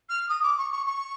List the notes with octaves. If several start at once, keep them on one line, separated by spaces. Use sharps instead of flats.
F6
D#6
D6
C#6
C#6
C#6